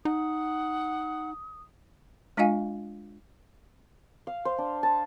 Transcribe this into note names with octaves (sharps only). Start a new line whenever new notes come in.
D#4 F#5 D#6
G#3 D4 F4 D#5 F5 G#5
F5
C5
D4
A5